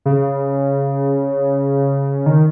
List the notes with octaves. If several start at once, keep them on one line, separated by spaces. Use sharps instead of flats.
C#3
D#3